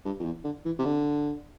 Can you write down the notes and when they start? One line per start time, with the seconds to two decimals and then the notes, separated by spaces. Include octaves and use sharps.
0.05 G2
0.20 F2
0.25 E2
0.44 D3
0.65 E3
0.78 C3
0.85 D3